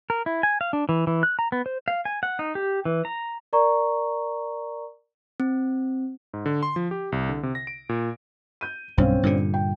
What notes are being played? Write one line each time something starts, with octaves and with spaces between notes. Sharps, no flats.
A#4
E4
G#5
F5
D4
E3
E3
F#6
A#5
B3
C5
F5
G#5
F#5
D#4
G4
E3
A#5
A#4 D5 A#5 C#6
C4
G#2
D3
C6
F3
G4
C2
D3
C3
A#6
D7
A#2
G6 D#7
B1 G2 C4 C#4 F5
G2 A#2 D3
G5